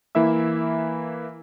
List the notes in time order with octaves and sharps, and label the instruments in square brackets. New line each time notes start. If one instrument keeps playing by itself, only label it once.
[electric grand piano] E3 A#3 E4 E5 E6